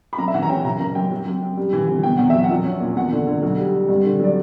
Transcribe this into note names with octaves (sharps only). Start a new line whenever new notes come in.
B5
F#2 A#5
E5
E3 F#5
A#5
C#4 G5
F#1 A#5
F#1 A#5
F#2 G5
F#3
F#2
F#2
G3
E3
G1
B2 G5
E2 F#5
F#3 E5
F#5
A#1
C#4
A#2
E2 F#5
D3
D3
B1
G3
G3
G2
D3
F#3 D5